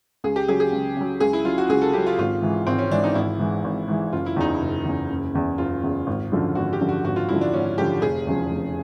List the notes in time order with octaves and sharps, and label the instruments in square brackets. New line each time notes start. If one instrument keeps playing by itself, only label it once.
[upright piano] C#2 [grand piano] G#4
[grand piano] G4
[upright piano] C#3 F#3 [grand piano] G#4
[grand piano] G#4
[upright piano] C#2
C#3 F#3
[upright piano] C#2 [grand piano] G#4
[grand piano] E4
[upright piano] C#3 F#3 [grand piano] F4
[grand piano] F#4
[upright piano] C#2 [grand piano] G#4
[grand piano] A4
[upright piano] C#3 F#3 [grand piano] G4
[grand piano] F4
[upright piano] G#1 [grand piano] F4
[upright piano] G#2 E3
[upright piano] G#1 [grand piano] C4
[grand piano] C#4
[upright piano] G#2 E3 [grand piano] D4
[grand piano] D#4
[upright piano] G#1 [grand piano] E4
[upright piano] G#2 E3
G#1
G#2 E3
[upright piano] F#1 [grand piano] F4
[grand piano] E4
[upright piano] E2 C#3 [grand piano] D#4
[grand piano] E4
[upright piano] F#1
E2 C#3
F#1
E2 C#3
[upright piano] F#1 [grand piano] F4
[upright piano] E2 C#3
G#1
F#2 D3 F3
[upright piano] G#1 [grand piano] F#4
[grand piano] G4
[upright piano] F#2 D3 F3
[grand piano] F#4
[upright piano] G#1 [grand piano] F#4
[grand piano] F4
[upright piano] F#2 D3 F3 [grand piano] E4
[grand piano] D4
[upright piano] G#1 [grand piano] C#4
[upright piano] F#2 D3 F3 [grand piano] G4
[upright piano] F1 [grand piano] G#4
[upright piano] E2 C#3 F3
F1